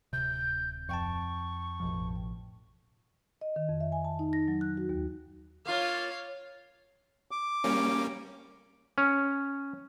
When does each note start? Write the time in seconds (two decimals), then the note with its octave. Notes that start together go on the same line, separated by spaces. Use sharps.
0.13 D1 C3 G6
0.89 F2 G5 A5 C#6
1.80 A1 B2 F3
3.41 D#5
3.56 D#3
3.69 F2
3.80 E5
3.92 G#5
4.05 A5
4.19 D#4
4.33 A#6
4.48 F#3
4.61 F#6
4.77 F#4
4.89 D#2
5.66 A#3 F4 C#5 F5
7.31 D6
7.64 G3 A#3 C#4
8.98 C#4